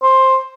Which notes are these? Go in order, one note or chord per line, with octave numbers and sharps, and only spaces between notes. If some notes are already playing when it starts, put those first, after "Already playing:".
C5